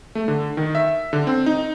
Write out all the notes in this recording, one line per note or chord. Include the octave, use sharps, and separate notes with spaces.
A3
D3
D#3
E5
D3
C4
D#4